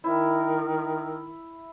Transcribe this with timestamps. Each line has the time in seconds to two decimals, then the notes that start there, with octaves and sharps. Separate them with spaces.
0.04 D#3 E4